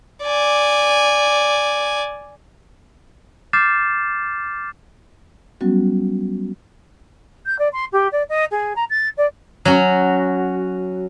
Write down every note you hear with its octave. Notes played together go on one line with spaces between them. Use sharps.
D5 G#5
D6 F6 G6 A6 C7 E7
F#3 G3 B3 C#4 F#4
G6
D5
C6
G4
D5
D#5
G#4
A#5
A6
D5
F#3 C#4 F#4